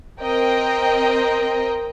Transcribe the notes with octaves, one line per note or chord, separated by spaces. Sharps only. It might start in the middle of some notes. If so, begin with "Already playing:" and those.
C4 A#4 D#5 G5